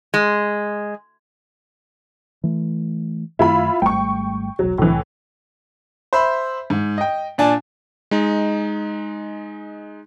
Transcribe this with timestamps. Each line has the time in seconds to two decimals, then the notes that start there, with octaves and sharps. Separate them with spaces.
0.14 G#3
2.44 E3 A3
3.39 F#2 D#3 A3 E4 F4 B5
3.82 G#1 G3 A3 G5 C#6
4.59 E1 B1 F#3
4.78 C2 A2 E3
6.13 C5 E5 B5
6.70 G#2
6.98 D#5 G5
7.38 A#2 D4 G#5 A5
8.11 G#3 D#4